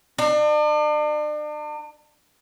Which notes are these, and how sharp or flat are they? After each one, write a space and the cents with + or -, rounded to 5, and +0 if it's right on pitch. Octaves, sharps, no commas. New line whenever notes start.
D4 +40